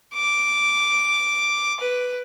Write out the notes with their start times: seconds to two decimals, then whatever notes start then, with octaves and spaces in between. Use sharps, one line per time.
0.14 D6
1.80 B4